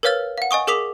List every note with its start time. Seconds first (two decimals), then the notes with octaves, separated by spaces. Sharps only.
0.03 A#4 B4 C#5 F5 F6 A6
0.38 F5 F#5
0.51 D#5 G#5 C#6 D#6
0.67 G#4 A#4 D6 D#6 B6 F7